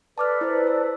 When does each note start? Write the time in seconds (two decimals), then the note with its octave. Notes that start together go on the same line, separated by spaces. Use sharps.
0.18 A4 B4 D5 A5 D6 F6
0.41 E4 C5
0.67 E6